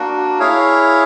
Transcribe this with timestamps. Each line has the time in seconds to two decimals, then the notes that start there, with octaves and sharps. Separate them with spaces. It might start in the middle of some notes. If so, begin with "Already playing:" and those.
Already playing: A#3 D4 F#4
0.39 E4 G#4 C#5 F5